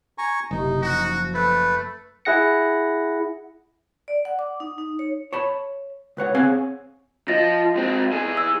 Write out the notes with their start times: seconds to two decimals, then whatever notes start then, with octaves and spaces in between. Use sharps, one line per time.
0.18 G#5 A#5 C#6
0.51 F#1 C3 D#4
0.82 F3 F#4
1.34 A3 B4
2.25 E4 G#4 F#5 A#6 C#7
4.08 D5
4.25 F#5
4.39 D6
4.60 D#4
4.78 D#4
4.99 C#5
5.33 C#5 A5 B5
6.17 C#2 B4 C#5 F#5
6.35 C4 G#4 C#5 F5 F#5 G#5
7.28 F3 D#5 A6 A#6
7.75 G#2 C4
8.12 E3 G#4
8.37 E6